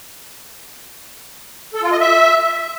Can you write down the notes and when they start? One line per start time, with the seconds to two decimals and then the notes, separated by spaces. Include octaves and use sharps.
1.74 A4
1.83 F4
1.91 D#5
2.00 E5